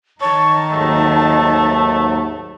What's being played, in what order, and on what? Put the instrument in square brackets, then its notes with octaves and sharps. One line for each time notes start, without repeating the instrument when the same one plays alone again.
[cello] D#3 D#4 [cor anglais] C#5 [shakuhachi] A5
[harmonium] D#2 G#2 F#3 [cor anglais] A3